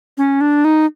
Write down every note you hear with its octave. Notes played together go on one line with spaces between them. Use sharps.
C#4
D4
D#4